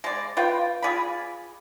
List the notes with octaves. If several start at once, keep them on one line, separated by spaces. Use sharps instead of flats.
G#3 D5
F4 B4 G5
F4 G#4 D5 B5